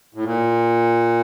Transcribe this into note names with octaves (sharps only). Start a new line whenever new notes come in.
A2
A#2